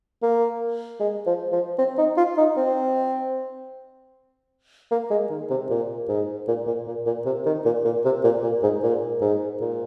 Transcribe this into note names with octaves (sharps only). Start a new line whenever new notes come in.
A#3
G#3
F3
F3
C4
D#4
F4
D#4
C4
A#3
G#3
D#3
C3
A#2
G#2
A#2
A#2
A#2
A#2
C3
D#3
A#2
A#2
C3
A#2
A#2
G#2
A#2
G#2
A#2